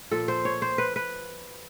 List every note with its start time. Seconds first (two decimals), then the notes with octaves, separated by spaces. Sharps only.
0.11 A#2 F3 A4
0.28 C5
0.45 C#5
0.62 C5
0.78 B4
0.96 B4